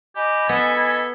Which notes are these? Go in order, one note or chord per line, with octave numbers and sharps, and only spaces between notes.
G4 D#5 G#5 B5
B3 A4 G#6 B6